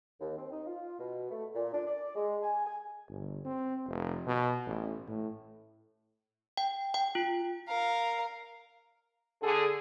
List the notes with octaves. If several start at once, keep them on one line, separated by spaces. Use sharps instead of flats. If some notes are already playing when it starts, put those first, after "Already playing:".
D#2
C4
D#4
F4
B2
A3
A#2
D4
D5
G#3
G#5
G#5
G1
C4
F1
B2
A1
A2
G5
G5
F4
A#4 F5
D3 G#4 A4